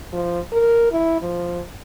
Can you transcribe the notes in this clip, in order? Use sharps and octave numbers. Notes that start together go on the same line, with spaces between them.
F3
A#4
E4
F3